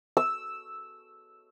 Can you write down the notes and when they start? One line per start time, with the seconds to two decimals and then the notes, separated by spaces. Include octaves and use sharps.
0.17 E6